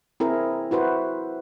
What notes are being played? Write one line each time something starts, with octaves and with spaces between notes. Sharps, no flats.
C4 E4 G#4 A#4
E4 F#4 B4 C5